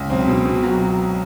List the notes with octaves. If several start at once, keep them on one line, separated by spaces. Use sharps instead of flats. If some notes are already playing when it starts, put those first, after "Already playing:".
Already playing: C#2
B1 C4
B2
B2
F#3